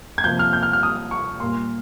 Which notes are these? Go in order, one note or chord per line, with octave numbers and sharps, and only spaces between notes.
G#6
C3 F3 A#3 G6
F6
G6
F6
F6
D#6
C#6
A#2 G3 A#3 C6